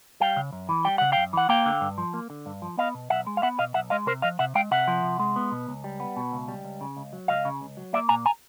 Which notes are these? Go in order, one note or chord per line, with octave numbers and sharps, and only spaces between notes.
G3 F5 G5
C#3
F#2
E3
G3 G5
C#3 F#5
F#2 F5 G5
E3 F#5
A#3 F5 G5
D3
G2
F3
A#3
D3
G2
F3
B3 D#5 F5
B2
B1 E5 F#5
G#3
F5
B3 E5 F#5
B2 D#5 F5
B1 E5 F#5
G#3 D#5 F5
C3 A#4 C5
F3 D#5 F5
C3 E5 F#5
G#3 F5 G5
C3 E5 F#5
F3
C3
G#3
B3
B2
C#2
G3
B3
B2
C#2
G3
C#2
C#3
C#2
F#3
C#2 D#5 F5
C#3
C#2
F#3
A#3 D5 E5
A#2 G#5 A#5
G#5 A#5